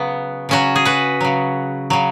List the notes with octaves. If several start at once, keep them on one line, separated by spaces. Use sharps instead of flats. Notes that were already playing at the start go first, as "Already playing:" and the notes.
Already playing: C#3 F#3 B3
C#3 F#3 C#4 F#4
G#4
F#4 B4
C#3 F#3
C#3 F#3